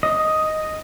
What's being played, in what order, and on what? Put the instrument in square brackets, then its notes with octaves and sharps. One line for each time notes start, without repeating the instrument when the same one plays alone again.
[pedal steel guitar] D#5